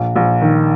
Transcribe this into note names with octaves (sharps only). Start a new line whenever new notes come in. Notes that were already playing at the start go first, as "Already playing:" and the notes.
Already playing: A#1
A#1
D#3